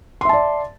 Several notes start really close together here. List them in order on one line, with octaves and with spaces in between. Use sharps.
C6 E5 A5 D5